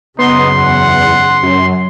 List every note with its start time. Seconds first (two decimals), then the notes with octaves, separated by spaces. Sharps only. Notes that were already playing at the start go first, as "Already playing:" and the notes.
0.19 F#2 C#3 B3 D#4 C6
0.58 E2 F#5
1.43 F#2 F#3